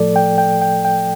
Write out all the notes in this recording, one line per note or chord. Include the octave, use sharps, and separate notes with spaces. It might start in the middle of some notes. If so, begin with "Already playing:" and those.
Already playing: A2 F3 A3 A4 D5
G5
G5
G5
G5